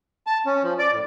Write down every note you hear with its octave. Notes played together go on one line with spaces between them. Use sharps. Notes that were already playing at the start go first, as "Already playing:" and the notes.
A5
C#4
F3
D5
A2